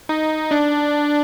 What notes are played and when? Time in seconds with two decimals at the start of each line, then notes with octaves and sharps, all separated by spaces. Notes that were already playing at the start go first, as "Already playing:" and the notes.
0.09 D#4
0.51 D4